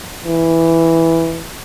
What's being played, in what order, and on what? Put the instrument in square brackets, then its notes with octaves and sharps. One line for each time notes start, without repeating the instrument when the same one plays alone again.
[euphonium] E3